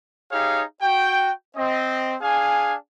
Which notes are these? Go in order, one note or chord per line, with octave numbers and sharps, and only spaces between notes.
D#4 G4 G#4 C#5 F5
F#4 G5
C4 D#5
D4 G#4 F5 G#5